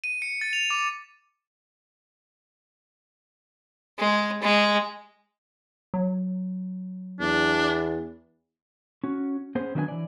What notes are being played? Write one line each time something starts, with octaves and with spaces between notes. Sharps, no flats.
D#7
C#7
A6
F7
D6
G#3
G#3
F#3
E2 D4
C#4 F#4
B3 C#4 G#4 C5
D#3 F#3 D4 B4 E5 G#5
E3 D5